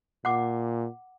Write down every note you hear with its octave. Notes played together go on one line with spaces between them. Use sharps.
A#2 F#5 D6